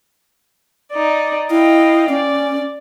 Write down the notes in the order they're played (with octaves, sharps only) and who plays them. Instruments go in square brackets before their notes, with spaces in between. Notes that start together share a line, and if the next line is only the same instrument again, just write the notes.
[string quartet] D#4 D5
[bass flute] E4 [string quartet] D#5 F5 G5
[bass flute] C#4 [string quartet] D5